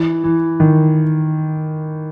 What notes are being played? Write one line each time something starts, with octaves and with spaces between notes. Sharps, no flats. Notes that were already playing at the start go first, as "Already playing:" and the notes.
Already playing: E3
E3
D#3